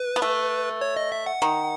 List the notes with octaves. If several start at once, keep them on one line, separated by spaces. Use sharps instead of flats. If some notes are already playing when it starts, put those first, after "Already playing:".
Already playing: B4
B3
A3
C#5
D#5
E5
F#5
D#3